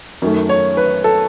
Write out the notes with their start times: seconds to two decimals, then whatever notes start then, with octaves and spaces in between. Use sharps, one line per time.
0.22 F#2 D#3 A3
0.49 C#5
0.77 B4
1.04 A4